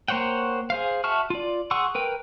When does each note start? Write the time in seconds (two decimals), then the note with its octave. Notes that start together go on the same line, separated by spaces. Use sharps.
0.08 A#3 C5 C#5 F#5 G5
0.70 G#4 C5 F5
1.04 F#4 E5 A5 C#6 F6
1.30 F4 D5
1.71 G#4 F#5 C6 C#6 E6
1.95 A#4 B4 G5